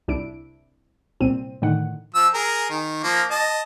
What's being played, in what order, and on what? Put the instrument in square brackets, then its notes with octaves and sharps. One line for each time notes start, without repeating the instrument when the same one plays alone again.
[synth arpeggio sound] C2 D4 E4 D7
C2 A#2 C4 D#7
A2 D3 D#3 F#5
[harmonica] F3 E6
G#4 A#4
D#3
F3 A#3
D#5 A5